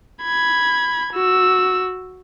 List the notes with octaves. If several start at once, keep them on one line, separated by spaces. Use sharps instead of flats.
B5 G#6
F#4 E6